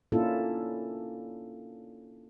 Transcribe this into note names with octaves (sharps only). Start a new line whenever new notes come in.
A#3 C#4 D4 E4 F4 A4